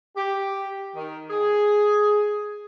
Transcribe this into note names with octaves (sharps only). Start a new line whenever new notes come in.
G4
D#3
G#4